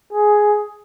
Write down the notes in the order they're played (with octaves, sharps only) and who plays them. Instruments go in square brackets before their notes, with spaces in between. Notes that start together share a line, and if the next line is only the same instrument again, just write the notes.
[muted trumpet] G#4